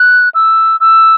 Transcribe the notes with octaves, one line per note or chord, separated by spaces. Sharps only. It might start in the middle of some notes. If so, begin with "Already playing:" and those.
Already playing: F#6
E6
E6